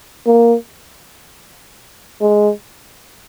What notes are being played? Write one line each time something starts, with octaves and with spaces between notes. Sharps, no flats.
A#3
G#3